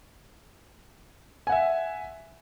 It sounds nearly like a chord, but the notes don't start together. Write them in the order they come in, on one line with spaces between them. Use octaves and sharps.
G#5 F#5 E5